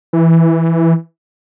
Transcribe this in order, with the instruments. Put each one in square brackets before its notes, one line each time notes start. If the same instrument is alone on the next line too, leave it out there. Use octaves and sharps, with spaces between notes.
[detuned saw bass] E3